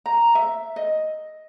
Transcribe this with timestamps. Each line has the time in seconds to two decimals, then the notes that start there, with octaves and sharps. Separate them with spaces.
0.06 A#5
0.35 E5
0.76 D#5